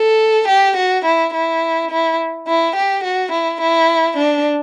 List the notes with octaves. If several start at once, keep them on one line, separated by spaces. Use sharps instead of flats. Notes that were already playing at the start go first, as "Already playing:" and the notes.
Already playing: A4
G4
F#4
E4
E4
E4
E4
G4
F#4
E4
E4
D4